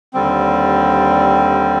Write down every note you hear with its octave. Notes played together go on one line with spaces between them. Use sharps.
D#2 D3 G3 C4